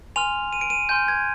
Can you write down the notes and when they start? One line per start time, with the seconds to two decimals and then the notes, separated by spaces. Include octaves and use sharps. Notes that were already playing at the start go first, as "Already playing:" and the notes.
0.16 G#5 C6 F6 F7
0.53 D#7
0.61 D7
0.70 D#7
0.89 G#5 C6 F6 G6
1.08 G#6